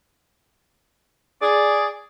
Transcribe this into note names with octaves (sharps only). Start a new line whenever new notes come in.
G#4 D5